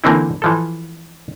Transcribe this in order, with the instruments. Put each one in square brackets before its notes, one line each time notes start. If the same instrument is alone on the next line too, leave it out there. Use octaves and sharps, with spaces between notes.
[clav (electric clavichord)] D3 E3 A#3 C4 D#4 E4
E3 F3 A4